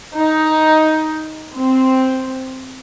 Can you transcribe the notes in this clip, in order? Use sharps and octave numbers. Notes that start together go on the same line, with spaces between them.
D#4
C4